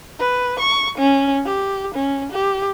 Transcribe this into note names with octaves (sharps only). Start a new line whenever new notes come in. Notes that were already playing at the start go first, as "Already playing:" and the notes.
B4
C#6
C#4
G4
C#4
G4